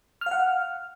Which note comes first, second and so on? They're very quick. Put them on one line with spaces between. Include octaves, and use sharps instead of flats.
F6 F5 F#5